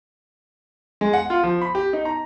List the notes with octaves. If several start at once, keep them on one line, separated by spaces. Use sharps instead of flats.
G#3
F#5
F4
F3
B5
G4
D#4
A#5